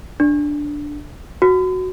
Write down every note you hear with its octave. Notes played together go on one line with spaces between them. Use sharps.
D4
F#4